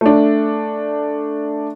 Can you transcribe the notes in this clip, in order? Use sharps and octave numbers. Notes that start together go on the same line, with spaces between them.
A3 D4